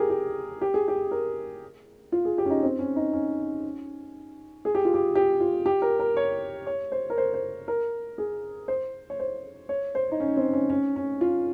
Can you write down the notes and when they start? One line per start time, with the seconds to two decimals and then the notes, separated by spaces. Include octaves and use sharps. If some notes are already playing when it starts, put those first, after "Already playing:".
Already playing: G4 G#4 A#4
0.10 G4
0.61 G4
0.74 G#4
0.88 G4
1.11 A#4
2.12 F4
2.25 G#4
2.38 G4
2.46 C#4
2.50 D#4
2.63 C4
2.79 C#4
2.96 D#4
3.13 C#4
4.65 G#4
4.75 G4
4.85 F4
4.94 G4
5.15 G4
5.40 F4
5.66 G4
5.82 A#4
5.99 A#4
6.17 C#5
6.67 C#5
6.92 C5
7.10 A#4
7.18 C5
7.34 C5
7.68 A#4
8.18 G#4
8.68 C5
9.10 C#5
9.19 C5
9.69 C#5
9.95 C5
10.12 D#4
10.20 C#4
10.37 C4
10.53 C#4
10.70 C#4
10.96 C#4
11.21 F4